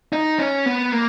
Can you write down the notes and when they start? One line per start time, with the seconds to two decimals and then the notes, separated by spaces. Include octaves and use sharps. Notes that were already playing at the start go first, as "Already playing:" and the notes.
0.13 D#4
0.39 C#4
0.66 B3
0.92 A#3